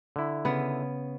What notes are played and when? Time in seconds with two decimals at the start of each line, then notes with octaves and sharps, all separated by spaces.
0.16 D3 E4
0.45 C#3 B3 G#4